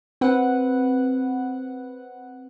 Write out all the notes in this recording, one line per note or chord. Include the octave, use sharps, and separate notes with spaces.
C4 B4 F#5